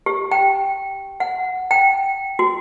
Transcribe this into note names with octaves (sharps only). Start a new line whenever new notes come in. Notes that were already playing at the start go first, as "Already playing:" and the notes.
G4
G5
F#5
G5
F#4